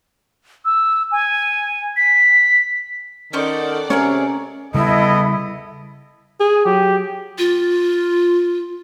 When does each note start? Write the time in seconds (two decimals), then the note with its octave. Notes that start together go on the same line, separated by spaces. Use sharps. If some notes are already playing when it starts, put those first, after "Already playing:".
0.65 E6
1.12 G#5
1.97 B6
3.33 D#3 C#4 A4 C5 D5 F#5 C#6
3.90 C3 C#4 G#4 A#4 C#5
4.74 C#3 G3 B3 E4 A4 D#5
6.40 G#4
6.65 F#3 G4
7.38 F4